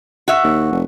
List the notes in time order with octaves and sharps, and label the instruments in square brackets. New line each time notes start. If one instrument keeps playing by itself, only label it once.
[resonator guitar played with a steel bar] F#4 E5
[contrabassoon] D#2
F1